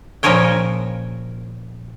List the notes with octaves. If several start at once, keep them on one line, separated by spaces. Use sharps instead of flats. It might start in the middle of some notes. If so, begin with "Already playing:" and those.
A#2 C#3 F3 A#4 C#5 G5